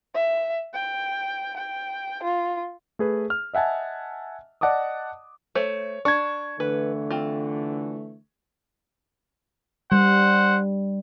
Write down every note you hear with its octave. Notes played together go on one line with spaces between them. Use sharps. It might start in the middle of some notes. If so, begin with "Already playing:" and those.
E5
G5
G5
F4
A3 G#4 B4
F6
D#5 E5 F#5 G#5 A5
D5 D#5 F#5 A5 D6 D#6
A3 C5 C#5
D4 C#6 G#6
D3 E3 A3 B4
C4 F4
G3 C5 F#5